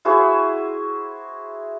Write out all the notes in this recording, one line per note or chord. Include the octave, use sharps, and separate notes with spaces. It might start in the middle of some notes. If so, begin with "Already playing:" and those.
E4 F#4 G#4 C5